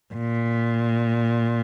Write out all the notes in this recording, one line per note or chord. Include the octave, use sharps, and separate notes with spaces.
A#2